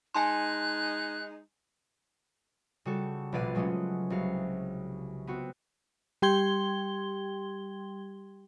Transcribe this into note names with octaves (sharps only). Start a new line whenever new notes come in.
G#3 D#4 G#5 A5 C6 F#6
C#3 G3 F#4 A4
A#1 B2 B4 D5 F5 D#7
C#3 F#3 G#3 A3 C#4
C2 C#3 F#4 F5
B3 C4 F#4
G3 G4 G5 C6 G#6 G7